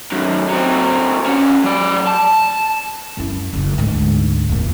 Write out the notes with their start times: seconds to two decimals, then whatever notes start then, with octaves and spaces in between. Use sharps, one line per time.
0.12 F#2 D#3
0.49 F#3 C4
1.26 E2 C#4
1.64 F#3 D5
2.07 A5
3.17 F#2 E4
3.53 F#1 D#3
3.78 D2 G#2
4.49 E2 A#2